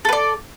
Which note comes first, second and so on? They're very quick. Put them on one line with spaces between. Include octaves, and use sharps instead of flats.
A4 B4 D5